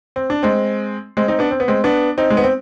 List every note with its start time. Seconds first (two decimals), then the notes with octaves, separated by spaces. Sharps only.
0.16 C4
0.30 D4
0.43 G#3 C4
1.17 G#3 C4
1.28 C4 D#4
1.39 B3 D4
1.51 C4
1.60 B3
1.68 G#3 C4
1.84 B3 D4
2.18 C4 D#4
2.30 G#3
2.37 B3
2.43 C4